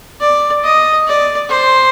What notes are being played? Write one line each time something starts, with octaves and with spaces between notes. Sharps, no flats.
D5
D#5
D5
C5